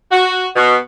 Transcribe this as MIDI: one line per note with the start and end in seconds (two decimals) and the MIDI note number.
0.11 0.46 66
0.56 0.76 47